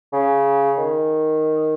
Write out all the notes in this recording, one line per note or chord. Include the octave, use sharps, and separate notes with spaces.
C#3
D#3